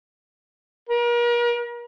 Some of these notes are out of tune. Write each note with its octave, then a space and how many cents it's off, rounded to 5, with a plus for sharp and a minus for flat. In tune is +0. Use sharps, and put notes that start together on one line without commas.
A#4 +40